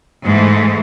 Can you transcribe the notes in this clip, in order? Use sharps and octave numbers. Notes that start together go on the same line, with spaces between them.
G#2 E3 A3